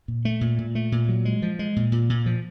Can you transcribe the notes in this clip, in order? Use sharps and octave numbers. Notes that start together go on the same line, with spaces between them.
A#2
A3
A#2
A#2
A3
A#2
F#3
G#3
F3
G#3
A#2
A#2
A#2
F3